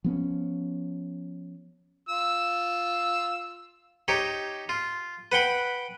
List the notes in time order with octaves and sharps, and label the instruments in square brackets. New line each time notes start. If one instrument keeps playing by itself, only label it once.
[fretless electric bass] F3 B3 C#4
[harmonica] F4 E6
[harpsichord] D#4 G4 C#5
F4
B4 F#5 G5 B5